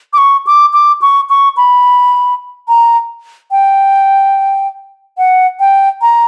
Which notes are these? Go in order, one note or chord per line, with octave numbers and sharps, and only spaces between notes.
D6
C#6
D6
D6
C#6
C#6
B5
A#5
G5
F#5
G5
A#5